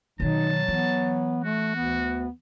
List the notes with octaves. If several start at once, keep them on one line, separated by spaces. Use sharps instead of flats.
B2 D#3 F#3 D#4 A5
E3 B3
A3 F#4
D2 B3